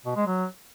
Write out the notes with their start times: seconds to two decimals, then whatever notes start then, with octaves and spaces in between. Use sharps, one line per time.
0.06 B2
0.16 G#3
0.27 F#3